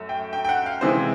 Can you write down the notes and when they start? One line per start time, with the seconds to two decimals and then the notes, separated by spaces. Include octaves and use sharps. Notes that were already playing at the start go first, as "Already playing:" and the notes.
Already playing: F#2 A3
0.09 G5
0.33 G5
0.44 G5
0.49 F#5
0.66 F5
0.81 C3 E3 G#3 C5